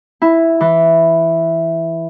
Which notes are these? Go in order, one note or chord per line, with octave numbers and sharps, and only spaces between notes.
E4
E3